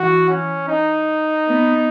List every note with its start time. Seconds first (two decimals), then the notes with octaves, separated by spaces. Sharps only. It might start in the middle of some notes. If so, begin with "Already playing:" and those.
Already playing: E3 F#4
0.29 C#4
0.68 D#4
1.47 B3